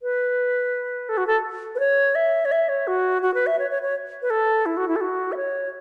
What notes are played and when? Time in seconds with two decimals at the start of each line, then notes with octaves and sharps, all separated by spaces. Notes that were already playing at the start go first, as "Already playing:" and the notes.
0.02 B4
1.09 A4
1.17 F#4
1.27 A4
1.75 B4
1.80 C#5
2.15 E5
2.45 C#5
2.52 E5
2.69 C#5
2.87 F#4
3.22 F#4
3.34 B4
3.47 E5
3.59 C#5
3.71 C#5
3.82 C#5
4.22 B4
4.30 A4
4.66 E4
4.77 F#4
4.88 E4
4.96 A4
5.01 F#4
5.32 E5
5.36 C#5